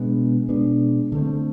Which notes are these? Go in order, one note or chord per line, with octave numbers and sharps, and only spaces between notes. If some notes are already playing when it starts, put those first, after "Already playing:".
Already playing: B2 G#3 B3 D4
B2 G#3 B3 D4
D3 F3 A3 C4